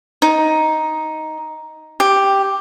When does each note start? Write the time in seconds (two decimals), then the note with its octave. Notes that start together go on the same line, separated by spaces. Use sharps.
0.22 D#4
2.00 G4